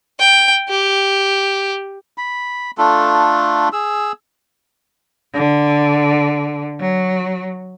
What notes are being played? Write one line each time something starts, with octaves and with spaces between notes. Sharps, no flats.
G5
G4
B5
A3 D4 F4 A4
G#4 E6
D3
F#3